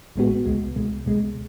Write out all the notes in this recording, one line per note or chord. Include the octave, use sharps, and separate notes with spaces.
A1 A2 G#3 B3 F#4
C#2 B2 G#3
C#2 B2 G#3
C#2 B2 G#3